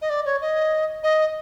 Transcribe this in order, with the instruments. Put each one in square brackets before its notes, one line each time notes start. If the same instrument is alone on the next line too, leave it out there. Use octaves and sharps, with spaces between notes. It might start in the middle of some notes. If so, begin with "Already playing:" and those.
[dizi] D#5
D5
C#5
D#5
D#5